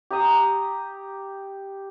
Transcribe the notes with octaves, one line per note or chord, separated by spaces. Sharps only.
G4 A#5 D#6